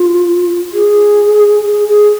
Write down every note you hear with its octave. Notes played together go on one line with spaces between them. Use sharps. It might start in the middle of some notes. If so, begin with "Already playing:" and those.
Already playing: F4
G#4
G#4
G#4